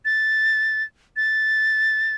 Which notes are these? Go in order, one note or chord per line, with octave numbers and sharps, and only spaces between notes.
A6
A6